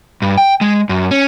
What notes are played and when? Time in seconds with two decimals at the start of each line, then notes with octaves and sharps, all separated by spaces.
0.22 G2
0.38 G5
0.61 G#3
0.89 F#2
1.11 C#4